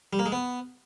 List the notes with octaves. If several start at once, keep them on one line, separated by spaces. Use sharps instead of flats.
G3
A#3
G#3
B3